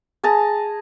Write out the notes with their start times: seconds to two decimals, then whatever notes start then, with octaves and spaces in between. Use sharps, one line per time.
0.24 G#4 A5 A#5